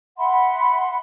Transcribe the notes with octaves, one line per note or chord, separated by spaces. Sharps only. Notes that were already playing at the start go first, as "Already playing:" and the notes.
E5 F#5 B5 C6